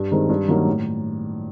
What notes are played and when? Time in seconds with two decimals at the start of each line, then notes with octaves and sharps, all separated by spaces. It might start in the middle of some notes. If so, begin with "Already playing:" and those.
Already playing: G2
0.12 D#3 G#3 C4
0.29 G2
0.48 D#3 F#3 A#3 C#4
0.66 A2